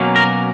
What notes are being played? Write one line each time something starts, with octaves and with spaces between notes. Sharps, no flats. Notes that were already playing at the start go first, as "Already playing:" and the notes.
Already playing: B2 F#3 A#3 C#4
A#4